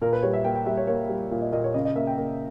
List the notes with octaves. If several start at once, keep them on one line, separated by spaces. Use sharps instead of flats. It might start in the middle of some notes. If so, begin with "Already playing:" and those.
A#2 A#4
B4
G3 C#5
E5
A#3 G5
G5
G3 E5
C#5
A#3 C#5
G3
A#2
D#5
A#2 D#5
C#5
C#3 D#5
D#5
A#3 E5
G5
A#3